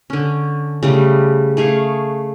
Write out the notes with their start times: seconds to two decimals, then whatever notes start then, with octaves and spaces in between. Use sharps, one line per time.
0.10 D3 C#4
0.83 C#3 G3 A3
1.57 A3 G#4 F5 C#6